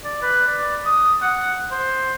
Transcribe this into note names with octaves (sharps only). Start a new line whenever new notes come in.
D5
B4
D5
D#6
F#5
C5